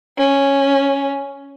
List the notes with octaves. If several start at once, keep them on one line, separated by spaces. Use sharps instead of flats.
C#4